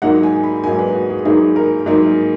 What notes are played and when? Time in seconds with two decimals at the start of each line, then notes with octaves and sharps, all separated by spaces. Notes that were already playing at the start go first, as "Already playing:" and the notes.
0.02 G#2 F#3 A#3 D#4 F#5
0.23 G#5
0.43 B5
0.64 G#2 F#3 A#3 D#4 G#5
0.79 B4
0.94 F#4
1.10 G#4
1.25 G#2 F#3 A#3 D#4 G#4
1.56 A#4
1.86 G#2 F#3 A#3 D#4